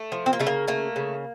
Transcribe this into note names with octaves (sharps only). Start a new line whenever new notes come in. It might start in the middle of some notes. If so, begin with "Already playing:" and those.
Already playing: A3
F3
C4
A#3
C#3 A3
A#3
A3 A#3
C#3